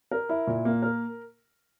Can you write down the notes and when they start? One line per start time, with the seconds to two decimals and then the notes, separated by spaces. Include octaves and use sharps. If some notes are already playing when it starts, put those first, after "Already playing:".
0.11 A#4
0.29 E4
0.47 A#2
0.65 A#3
0.83 A#4